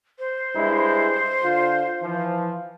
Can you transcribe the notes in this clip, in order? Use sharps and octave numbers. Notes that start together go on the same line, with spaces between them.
C5
G2 G#3 E4
D3 F4
E3 F3